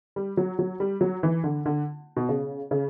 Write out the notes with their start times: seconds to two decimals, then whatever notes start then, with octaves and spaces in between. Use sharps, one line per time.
0.16 G3
0.37 F#3
0.59 F#3
0.80 G3
1.01 F#3
1.23 E3
1.44 D3
1.66 D3
2.17 B2
2.29 C#3
2.71 C#3